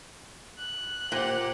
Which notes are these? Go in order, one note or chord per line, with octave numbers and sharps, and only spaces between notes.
F#6
A#2 G4 C5 F#5